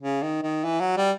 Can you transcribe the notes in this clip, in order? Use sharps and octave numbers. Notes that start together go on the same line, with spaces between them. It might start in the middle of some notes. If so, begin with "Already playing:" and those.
C#3
D#3
D#3
E3
F#3
G3